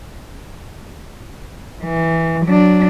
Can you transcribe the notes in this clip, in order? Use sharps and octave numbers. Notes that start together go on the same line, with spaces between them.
E3
F#3 D4